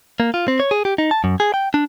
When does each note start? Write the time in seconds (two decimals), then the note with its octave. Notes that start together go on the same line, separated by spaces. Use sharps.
0.20 A#3
0.34 F4
0.48 C4
0.60 C#5
0.71 G#4
0.85 G4
0.98 D#4
1.11 A5
1.24 F#2
1.40 G#4
1.54 G5
1.74 D4